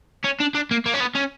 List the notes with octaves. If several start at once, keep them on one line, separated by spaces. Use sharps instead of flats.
C#4
D4
D4
A#3
A#3
C#4
B3
C#4